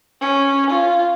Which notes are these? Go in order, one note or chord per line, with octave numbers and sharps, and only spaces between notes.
C#4
F4